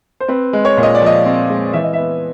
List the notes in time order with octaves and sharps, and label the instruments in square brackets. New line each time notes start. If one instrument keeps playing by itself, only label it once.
[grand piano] C5
C4 B4
G#3
C#5
A#2
D#5
D5
F3 D#5
C4
G#3
E3 E5
D#5
B3 E5